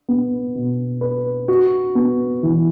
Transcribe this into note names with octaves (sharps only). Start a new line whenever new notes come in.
B3
B2
B4
F#4
B3
E3